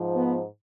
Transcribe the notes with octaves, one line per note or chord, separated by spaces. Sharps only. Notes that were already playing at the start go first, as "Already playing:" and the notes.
Already playing: G#2 F3
B3